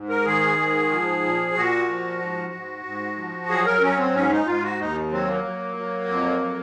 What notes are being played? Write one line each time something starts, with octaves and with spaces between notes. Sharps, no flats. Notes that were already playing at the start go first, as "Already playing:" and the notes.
Already playing: G#2
A#4
D#3 G#4
G#2
F3
A#2
A#2 F#4
F3
G#2
G#2
G#2
F3
F#3 G#4
A#4
F#3 C#4
C4
G#2 C#4
D#4
G#2 F4
F#4
D#2 D#4
F#3 C4
A#3
F#3
F#3
F2
F#3